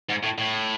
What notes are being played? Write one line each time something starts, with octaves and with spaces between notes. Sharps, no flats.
G#2
A2
A2